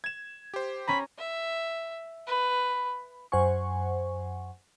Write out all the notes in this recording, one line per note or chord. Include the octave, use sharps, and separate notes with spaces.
G#6 E7
G4 C5
C#4 A#5 B5
E5
B4
F#2 C5 F#5 G#5 C#6